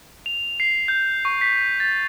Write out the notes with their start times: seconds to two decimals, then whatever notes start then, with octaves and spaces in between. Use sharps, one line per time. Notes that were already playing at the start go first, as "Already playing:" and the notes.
0.26 F7
0.60 C7
0.88 G6
1.25 C#6
1.41 B6
1.80 A6